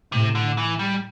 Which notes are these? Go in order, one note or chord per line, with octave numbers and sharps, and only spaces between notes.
A2 C3
D3
E3
G3